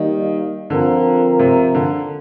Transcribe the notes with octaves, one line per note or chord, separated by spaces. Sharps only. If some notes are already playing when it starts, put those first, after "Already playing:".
Already playing: D#3 G3 A#3 D#4
D3 F3 C4 F4 A#4
C3
D3